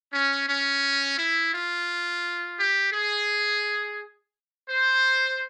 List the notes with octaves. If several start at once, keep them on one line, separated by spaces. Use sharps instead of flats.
C#4
C#4
E4
F4
G4
G#4
C5